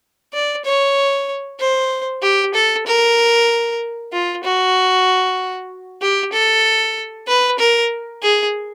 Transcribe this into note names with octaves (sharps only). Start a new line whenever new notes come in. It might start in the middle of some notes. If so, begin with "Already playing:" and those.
D5
C#5
C5
G4
A4
A#4
F4
F#4
G4
A4
B4
A#4
G#4